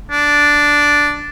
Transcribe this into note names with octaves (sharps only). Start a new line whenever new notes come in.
D4